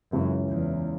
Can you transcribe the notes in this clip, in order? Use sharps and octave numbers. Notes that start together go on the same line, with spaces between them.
C#2 F#2 C#3 E3 G#3 C#4
E2